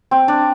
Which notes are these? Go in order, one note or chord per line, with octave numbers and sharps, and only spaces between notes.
C4
D4